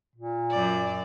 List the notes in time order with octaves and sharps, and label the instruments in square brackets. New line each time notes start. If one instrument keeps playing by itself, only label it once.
[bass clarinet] A#2
[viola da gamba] F#2 D5